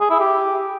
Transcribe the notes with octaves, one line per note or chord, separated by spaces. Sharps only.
G#4
E4
G4